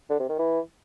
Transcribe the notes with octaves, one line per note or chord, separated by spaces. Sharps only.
D3
C3
D#3
E3